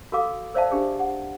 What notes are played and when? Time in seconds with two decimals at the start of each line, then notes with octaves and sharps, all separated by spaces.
0.12 F#4 A4 A#4 F5 D6
0.54 A#4 C5 D5 E5 F5 A5
0.71 D4 G4 G#4
0.99 F#5